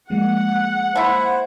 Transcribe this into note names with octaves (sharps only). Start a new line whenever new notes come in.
F3 G#3 A#3 F#5
A3 E4 C5